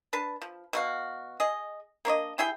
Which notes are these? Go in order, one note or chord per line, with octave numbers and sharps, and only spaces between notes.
D4 B4 A5
F3
B2 F#4 F5
G#4 D#5
A#3 D4 C#5 D#5
G3 E4 G#4 G5